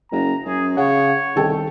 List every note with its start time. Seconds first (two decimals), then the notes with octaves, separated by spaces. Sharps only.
0.12 F#1 A#5
0.46 F#2 G#4
0.77 C#3 C#5 F#5
1.36 C2 D#3 A4 G5